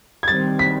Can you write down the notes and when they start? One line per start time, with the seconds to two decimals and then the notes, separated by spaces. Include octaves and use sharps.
0.23 G#6
0.28 D#3 G3 C4 A6
0.59 B6